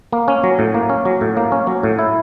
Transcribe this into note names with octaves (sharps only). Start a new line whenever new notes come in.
A#3
C#4
F#3
A2
A#3
C#4
F#3
A2
A#3
C#4
F#3
A2
E4